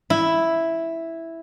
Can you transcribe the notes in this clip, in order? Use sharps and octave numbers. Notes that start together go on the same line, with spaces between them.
E4